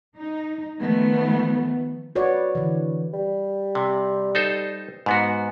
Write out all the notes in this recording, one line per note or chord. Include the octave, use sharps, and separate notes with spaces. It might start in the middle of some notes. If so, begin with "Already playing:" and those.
D#4
D#3 F3 A3 B3
F#4 B4 C#5 D5
D3 E3
G3
C3
D#4 A4 C5
G#2 B3 F#4